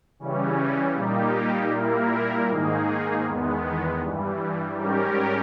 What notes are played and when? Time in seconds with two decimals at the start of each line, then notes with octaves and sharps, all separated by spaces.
0.19 C#3 E3 G3 C#4
0.95 A#2 G3 A#3 D#4 G4
1.72 A#2 G3 A#3 E4 A#4
2.48 G#2 D#3 A#3 D#4 G#4
3.24 E2 D#3 G#3 B3
4.01 G2 E3 G3
4.77 G#2 G3 C#4 G4 A#4